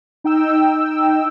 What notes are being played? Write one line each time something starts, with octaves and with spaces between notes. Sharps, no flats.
D#4 G5 E6